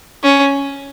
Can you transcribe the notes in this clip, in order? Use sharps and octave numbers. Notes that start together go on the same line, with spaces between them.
C#4